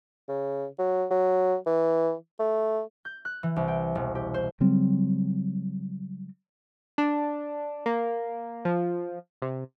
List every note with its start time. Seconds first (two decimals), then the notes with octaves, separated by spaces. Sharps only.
0.28 C#3
0.78 F#3
1.10 F#3
1.66 E3
2.39 A3
3.05 G6
3.25 F#6
3.43 E3
3.56 C2
3.68 G5
3.95 E1
4.15 G4
4.34 C5
4.60 C#3 F#3 G3 C4
6.98 D4
7.86 A#3
8.65 F3
9.42 C3